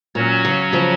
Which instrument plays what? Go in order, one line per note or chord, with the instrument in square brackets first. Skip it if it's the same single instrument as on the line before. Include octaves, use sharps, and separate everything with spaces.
[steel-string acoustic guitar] A#2 [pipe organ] F#3 C#4 F#4 C#5
[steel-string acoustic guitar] C#3
C#3 F3